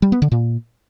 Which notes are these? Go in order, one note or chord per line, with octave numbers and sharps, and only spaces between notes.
G3
B3
D3
A#2